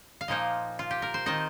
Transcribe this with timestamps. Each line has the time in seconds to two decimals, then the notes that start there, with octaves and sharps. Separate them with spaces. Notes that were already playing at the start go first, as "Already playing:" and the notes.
0.21 F5
0.28 A#2 F3 A#3 D#4 D#5
0.79 F4
0.91 G4
1.02 A#4
1.14 C5
1.26 D#3 C4 D#4 D#5